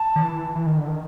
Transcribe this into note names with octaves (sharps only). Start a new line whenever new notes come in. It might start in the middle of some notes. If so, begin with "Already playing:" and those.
Already playing: A5
D#3
E3
E3
D#3
D3
D#3